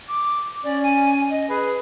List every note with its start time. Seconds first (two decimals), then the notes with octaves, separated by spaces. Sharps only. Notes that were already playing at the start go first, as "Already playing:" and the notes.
0.08 D6
0.64 C#4 D5
0.83 G#5
1.30 D#5
1.49 G#4 B4